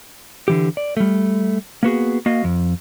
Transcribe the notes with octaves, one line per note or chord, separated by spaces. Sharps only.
D3 E3 G4
D5
G3 A3
A#3 B3 F#4 G#4
A#3 F#4 D#5 F5
F2